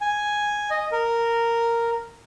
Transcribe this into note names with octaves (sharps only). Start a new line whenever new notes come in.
G#5
D#5
A#4